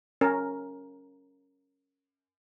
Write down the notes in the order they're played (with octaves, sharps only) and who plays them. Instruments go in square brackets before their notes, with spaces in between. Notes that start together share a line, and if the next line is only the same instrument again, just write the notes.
[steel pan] C#4 A#4